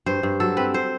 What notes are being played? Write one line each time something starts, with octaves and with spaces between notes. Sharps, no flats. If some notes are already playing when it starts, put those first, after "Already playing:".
G2 C5
G2
F#3 A4
C4 B4
C5